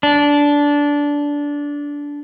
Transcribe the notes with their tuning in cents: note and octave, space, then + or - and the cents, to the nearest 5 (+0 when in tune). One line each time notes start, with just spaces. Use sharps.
D4 -15